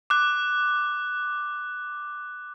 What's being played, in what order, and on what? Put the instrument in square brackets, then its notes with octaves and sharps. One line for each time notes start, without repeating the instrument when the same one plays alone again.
[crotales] D6 F#6